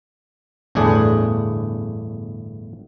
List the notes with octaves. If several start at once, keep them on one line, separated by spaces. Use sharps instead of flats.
G1 E2 A2 D4 G#4